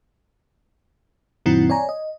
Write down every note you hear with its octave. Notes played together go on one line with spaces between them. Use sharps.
F#2 A#2 D#3 F#3 C4 E4
C#5 D5 G#5 A#5
D#5